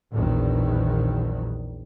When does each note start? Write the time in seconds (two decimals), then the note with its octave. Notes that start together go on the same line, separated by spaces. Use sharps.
0.12 A#1 E2 B2 D#3 F#3